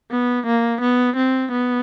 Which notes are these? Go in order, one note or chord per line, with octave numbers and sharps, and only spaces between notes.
B3
A#3
B3
C4
B3